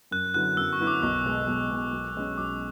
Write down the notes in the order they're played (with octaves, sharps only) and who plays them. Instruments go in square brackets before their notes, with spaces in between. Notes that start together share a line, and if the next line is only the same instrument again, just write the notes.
[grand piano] F#2 [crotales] F#6
[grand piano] D3 F#3 B3 E4 [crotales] F#6
[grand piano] F#2 [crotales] E6
[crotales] C#6
[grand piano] D3 F#3 B3 E4
[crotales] D6
[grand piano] B1 [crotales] C#6
[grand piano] B2 G#3
B1
B2 G#3
B1
B2 G#3 C#4
[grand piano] B1 [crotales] D6